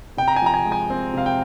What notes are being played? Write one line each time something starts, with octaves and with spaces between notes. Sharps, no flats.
C3 G5
A#5
G#5
F3 A#5
G#5
G#3
G#5
C4
C3 F5
G5